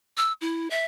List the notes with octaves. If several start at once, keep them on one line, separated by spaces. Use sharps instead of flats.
E6
E4
E5